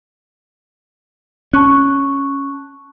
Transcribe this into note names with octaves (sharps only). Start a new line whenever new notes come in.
C#4 A5 C#6 F#6